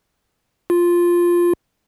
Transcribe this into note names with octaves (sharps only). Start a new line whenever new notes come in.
F4